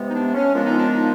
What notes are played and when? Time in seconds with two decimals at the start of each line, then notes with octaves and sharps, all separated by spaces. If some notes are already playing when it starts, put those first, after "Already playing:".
Already playing: C3 E3 G#3 B3
0.09 D#4
0.14 D4
0.34 C#4
0.54 A#2 F3 G#3 B3 D4
0.65 D#4
0.78 D4
0.93 D#4